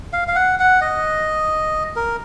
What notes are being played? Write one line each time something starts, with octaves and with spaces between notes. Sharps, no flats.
F5
F5
F#5
F#5
D#5
A#4